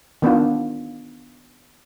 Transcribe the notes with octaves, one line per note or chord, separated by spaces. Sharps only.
D#3 B3 D4 F4